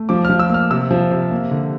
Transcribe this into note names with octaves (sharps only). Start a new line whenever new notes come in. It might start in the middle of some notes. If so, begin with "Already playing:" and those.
Already playing: A3
F3 D6
F3 F6
E6
A#3 F6
C3 E6
F3
C3
A#3
D3